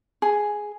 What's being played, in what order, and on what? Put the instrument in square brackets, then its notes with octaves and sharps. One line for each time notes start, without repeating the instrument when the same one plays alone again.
[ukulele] G#4